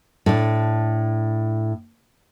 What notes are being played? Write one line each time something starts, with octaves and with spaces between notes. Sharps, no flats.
A2 D4